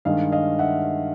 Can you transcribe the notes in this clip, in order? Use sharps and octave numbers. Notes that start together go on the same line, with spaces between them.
G2 D#3 G#3 D#5 F5
D#5 F5
E5 F#5